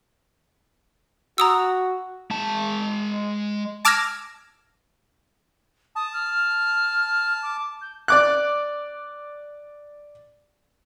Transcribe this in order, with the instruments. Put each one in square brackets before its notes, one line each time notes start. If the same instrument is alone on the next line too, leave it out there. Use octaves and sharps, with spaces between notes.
[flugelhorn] F#4 [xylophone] A#5 D#6 E6
[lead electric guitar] G#3 A5
[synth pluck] A5 D6 E6 F6 G#6 A#6
[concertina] A5 [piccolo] D#6
[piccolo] F6
D6
G6
[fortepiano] D5 D6 F#6